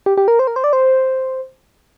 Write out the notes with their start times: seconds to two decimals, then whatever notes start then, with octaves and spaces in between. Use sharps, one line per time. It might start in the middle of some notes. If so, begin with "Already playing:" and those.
0.06 G4
0.17 G4
0.28 A#4
0.39 C5
0.47 A#4
0.56 C5
0.64 D5
0.73 C5